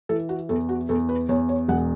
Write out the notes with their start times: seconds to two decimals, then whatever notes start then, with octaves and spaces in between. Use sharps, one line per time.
0.09 E3 A4
0.29 F#4
0.49 E2 A4
0.69 F#4
0.89 E2 A4
1.09 B4
1.29 E2 C#5
1.49 C#5
1.68 E1 F#5